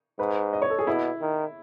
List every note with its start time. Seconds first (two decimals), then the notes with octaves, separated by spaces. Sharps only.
0.19 G#2 B4
0.53 D#5
0.62 C#5
0.70 A4
0.79 G#4
0.87 B2 E4
1.21 D#3